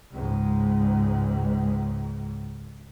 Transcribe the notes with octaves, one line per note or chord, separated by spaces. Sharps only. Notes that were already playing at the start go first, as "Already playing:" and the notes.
C#2 G#2